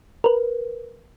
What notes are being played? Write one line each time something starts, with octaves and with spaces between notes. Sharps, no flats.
A#4 B4